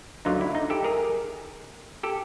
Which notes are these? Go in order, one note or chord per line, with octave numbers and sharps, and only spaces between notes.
D2 D3 F#3 D#4 F4
E4
D#4
G4 A4
G#4 A#4
G4 A4